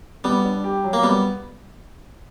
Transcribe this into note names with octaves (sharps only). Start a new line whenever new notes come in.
G3 B3
D4
G4
F#3
A#3
G3 B3